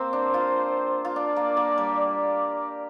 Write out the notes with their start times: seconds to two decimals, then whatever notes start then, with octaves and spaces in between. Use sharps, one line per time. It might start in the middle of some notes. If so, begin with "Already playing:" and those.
Already playing: A#3 C4 C5
0.13 D4
0.34 F4
1.05 F4
1.16 D4 D5
1.36 A#3
1.57 A#3
1.78 G3
1.98 D5